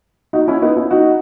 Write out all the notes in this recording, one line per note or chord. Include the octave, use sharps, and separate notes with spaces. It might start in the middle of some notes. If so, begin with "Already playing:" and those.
D#4 F#4
C#4 E4
B3 D#4
C#4 E4
D#4 F#4